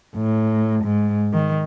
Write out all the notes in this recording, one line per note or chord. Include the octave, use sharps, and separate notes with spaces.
A2
G#2
D#3